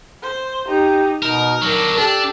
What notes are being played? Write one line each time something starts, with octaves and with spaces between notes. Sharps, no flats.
C5
D#4 G4 A#5
B2 D#4 A#4
F#3 D4 A#4
D4 G4 A4